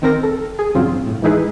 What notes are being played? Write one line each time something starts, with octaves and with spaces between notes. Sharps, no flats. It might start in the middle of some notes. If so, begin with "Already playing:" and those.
D#3 C4 A#4 A#6
A4
G#4
A1 G2 C#3 F#3 C4 F4
A2
E3 G#3 D#4 E4 G#4 B4